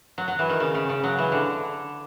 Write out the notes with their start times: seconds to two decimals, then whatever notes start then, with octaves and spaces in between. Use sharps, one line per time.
0.18 F#3
0.28 F#3
0.39 E3
0.50 D#3
0.60 C#3
0.75 C#3
0.89 C#3
1.04 F#3
1.19 E3
1.32 D3